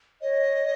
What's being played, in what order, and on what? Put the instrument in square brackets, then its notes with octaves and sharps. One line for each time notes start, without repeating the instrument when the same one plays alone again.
[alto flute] C#5 [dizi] D#5